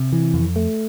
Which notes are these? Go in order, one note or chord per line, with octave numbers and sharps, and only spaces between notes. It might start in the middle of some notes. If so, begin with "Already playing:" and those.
Already playing: C3
E3
F2
A3